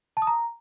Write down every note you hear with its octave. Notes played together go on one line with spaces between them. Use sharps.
A5
D#6
A#5